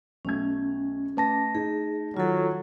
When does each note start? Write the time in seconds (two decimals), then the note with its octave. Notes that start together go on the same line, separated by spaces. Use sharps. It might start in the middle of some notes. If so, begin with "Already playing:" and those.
0.25 B1 A3 C#4 G#6
1.17 A3 B4 A5 A#6
1.55 D#4 G#4
2.17 D#3 F#3 F4 A4